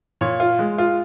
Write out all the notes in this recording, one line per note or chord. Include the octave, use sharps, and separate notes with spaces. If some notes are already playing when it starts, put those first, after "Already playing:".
A#2 C#5
F4
G#3
F4